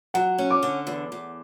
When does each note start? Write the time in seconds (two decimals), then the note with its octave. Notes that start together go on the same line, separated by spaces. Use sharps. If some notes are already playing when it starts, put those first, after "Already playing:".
0.14 F#3 F#5
0.38 C#4
0.51 D6
0.63 D3
0.87 E2
1.12 E2